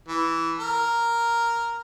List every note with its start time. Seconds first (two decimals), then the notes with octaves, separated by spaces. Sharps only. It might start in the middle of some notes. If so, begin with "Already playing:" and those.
0.09 E3
0.59 A#4